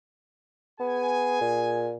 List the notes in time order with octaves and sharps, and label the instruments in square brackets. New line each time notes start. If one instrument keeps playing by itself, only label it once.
[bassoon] B3 [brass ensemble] G#4 G#5
[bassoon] A#2